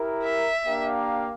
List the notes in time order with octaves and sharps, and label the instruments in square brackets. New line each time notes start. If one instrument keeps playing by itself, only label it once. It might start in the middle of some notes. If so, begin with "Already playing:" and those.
Already playing: [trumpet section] E4 G4 A#4
[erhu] E5
[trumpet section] A#3 D4 G4 A#4 F5